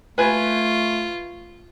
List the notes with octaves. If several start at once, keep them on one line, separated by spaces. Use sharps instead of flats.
A3 F4 B4 G#5